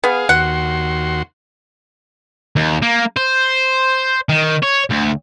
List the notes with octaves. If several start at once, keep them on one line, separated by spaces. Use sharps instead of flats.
B3 G#4 F5
D#2 F#4 F#5 C6
D#2
A#3
C5
D#3
C#5
D2